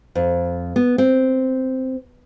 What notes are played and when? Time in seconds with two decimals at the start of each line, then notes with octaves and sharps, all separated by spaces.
0.15 F2
0.76 B3
0.98 C4